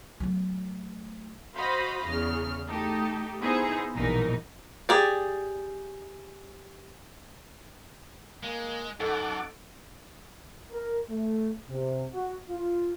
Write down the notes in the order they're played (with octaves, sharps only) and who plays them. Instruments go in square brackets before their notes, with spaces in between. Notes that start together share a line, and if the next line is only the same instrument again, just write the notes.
[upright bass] F#3 A3
[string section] F#4 C5 D#5 F5 B5
E2 C#3 F6
A3 D#4 G4 A4
B3 D#4 E4 G#4 C5
A#1 G2 B2 E3 D#4 A#4
[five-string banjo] G4 G#4 D5
[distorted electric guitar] G#3 [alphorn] A#3
[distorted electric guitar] F#2 [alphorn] D#4 [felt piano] A4 [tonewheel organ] F#5 A5 D6
[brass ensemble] A#4
A3
C3
F#4
F4